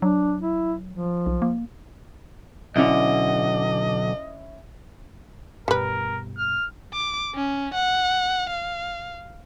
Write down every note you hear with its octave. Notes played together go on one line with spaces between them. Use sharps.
F#3 D4
E4
F3
B1
A#3
B1 D3 C#4 E4 D#5 E5
G2 B2 G3 A#4 B4
F6
D6
C#4
F#5
F5